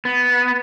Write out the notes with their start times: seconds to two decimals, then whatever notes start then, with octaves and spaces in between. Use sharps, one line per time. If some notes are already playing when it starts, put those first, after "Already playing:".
0.05 B3